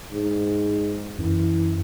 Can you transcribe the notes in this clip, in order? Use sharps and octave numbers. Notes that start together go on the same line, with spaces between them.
G#2
F#2 E3